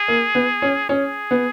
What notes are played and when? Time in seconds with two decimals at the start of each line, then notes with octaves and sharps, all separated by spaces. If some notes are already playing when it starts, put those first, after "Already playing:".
Already playing: G#4
0.08 A#3
0.35 B3
0.62 C#4
0.89 C#4 G#4
1.31 B3